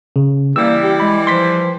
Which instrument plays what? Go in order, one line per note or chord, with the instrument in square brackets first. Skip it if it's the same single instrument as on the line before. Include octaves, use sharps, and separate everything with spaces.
[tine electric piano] C#3
[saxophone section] E3 G3 [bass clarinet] A#3 [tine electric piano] E6
[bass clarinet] G4
[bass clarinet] G#3 [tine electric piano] B5
[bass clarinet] F3 [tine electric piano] C6 B6